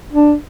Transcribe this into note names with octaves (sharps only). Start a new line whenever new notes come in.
D4